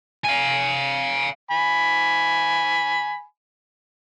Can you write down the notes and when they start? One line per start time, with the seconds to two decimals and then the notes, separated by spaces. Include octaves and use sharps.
0.25 F5 G#5
1.51 G#5 B5